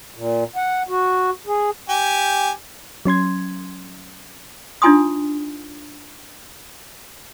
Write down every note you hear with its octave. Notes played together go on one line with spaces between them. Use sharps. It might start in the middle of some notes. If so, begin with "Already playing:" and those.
A#2
F#5
F#4
G#4
G4 G#5
F#3 C#4 C6 G#6
D4 D#4 F4 G#5 C6 D#6